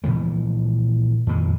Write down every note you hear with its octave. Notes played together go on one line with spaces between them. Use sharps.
A#2 E3 F3 G#3
F2 A#2 D#3 G#3